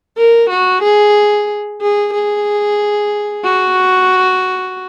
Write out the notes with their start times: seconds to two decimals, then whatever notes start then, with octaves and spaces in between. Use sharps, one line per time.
0.17 A#4
0.50 F#4
0.83 G#4
1.81 G#4
2.13 G#4
3.45 F#4